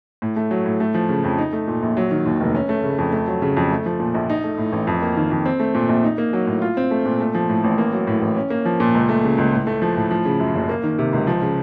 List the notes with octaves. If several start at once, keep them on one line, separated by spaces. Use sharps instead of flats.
A2
A3
F#3
A2
A3
F3
C#3
F2
D#4
A3
A#2
A#1
F#3
D#3
D#2
F1
C#4
A3
C#3
F2
A3
F#3
C#3
F2
A3
F3
A#2
A#1
D#4
A3
A2
A1
F2
A#3
D#3
F2
C4
A3
A#2
A#1
D#4
A#3
F#3
A2
F4
C4
A3
A#2
A3
F3
A2
A1
A#3
F#3
A2
A1
C#4
A#3
F3
A#2
C#2
A3
C#3
C#2
A2
A3
F3
A2
F3
C#3
F#2
F#1
A#3
D#3
C3
C#2
F3
C#3